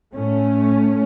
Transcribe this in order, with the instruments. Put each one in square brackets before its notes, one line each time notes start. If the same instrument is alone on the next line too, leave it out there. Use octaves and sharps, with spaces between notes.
[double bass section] A2 A3 C#4